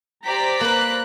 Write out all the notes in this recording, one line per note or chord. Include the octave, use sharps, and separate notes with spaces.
G4 C5 D5 A#5 B6
A#3 B4 F#6